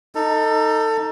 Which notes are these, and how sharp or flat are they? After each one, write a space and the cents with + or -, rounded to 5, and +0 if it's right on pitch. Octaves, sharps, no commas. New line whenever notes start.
D#4 +0 A4 +25